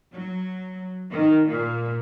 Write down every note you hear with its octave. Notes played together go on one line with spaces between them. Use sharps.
F#3
D#3
A#2